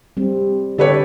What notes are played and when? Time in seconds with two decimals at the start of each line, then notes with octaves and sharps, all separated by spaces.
0.17 G3 C4
0.78 D3 G4 A4 B4 C#5 D5